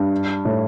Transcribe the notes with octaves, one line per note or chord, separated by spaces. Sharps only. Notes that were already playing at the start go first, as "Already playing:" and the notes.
Already playing: G2
A2